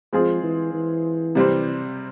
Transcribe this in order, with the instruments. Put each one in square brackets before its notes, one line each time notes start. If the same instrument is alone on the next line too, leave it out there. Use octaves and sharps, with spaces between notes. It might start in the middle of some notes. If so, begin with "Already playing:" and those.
[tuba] F3 [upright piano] G#3 C4 F4 G#4
[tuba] E3
E3
[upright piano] C3 G3 C4